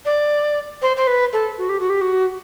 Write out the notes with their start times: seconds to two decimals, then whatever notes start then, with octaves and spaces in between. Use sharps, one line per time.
0.06 D5
0.82 C5
0.97 C5
1.07 B4
1.33 A4
1.58 F#4
1.69 G4
1.80 F#4
1.90 G4
2.01 F#4